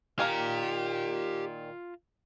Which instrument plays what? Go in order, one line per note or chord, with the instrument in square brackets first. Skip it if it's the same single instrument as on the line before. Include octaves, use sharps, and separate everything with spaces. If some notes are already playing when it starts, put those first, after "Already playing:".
[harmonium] A#2 D#3 [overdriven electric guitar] F4 A#5 [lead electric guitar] G4 [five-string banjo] A#4 F5 G#5